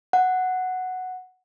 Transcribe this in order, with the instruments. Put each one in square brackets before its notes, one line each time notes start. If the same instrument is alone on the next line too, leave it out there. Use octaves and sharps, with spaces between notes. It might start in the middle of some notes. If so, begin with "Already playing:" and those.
[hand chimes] F#5